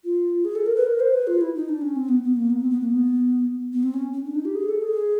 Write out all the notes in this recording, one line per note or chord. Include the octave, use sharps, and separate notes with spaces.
F4
G#4
A4
A#4
B4
A#4
C5
B4
F4
E4
D#4
D4
C#4
C4
B3
B3
A#3
B3
C4
B3
A#3
B3
B3
C4
C#4
C#4
D4
D#4
G4
G#4
A4
G#4